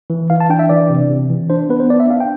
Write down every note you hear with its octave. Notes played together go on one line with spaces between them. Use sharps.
E3
E3 F5
A5
D4 G5
E5
E3 D5
C3
C3
E3
D4 C5
B3 B4
C5
D4 D5
E5
D4 F5
G5